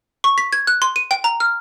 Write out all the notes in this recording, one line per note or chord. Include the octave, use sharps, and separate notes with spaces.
C#6
B6
G#6
F#6
C6
D#7
G5
A#5
F6